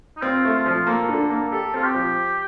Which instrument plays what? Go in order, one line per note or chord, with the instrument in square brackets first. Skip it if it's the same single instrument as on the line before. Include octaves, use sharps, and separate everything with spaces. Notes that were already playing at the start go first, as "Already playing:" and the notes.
[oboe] D#4
[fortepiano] C4 [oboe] F4
[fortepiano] A3
[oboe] F4
[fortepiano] F3
[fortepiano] A#3 [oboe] A4
[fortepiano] D3
A#3
[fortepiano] G4 [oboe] A4
[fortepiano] C4 [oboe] F4
[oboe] G4
[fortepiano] F3